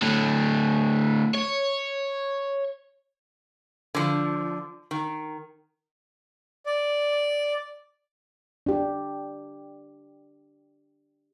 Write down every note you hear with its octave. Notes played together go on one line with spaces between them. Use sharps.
A2 D3
C#5
D3 F3
D#3
D5
D4 G4